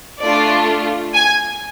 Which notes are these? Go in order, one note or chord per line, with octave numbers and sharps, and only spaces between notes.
A3 D4 F4 D5
G#5